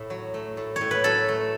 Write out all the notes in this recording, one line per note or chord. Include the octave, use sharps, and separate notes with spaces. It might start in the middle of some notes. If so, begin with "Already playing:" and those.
Already playing: A2 A3
F#3
A3
A2
C#5
A2
B4
F#3 A4
A3